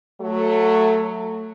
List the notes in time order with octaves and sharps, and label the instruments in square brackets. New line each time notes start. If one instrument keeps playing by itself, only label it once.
[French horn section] F#3 A3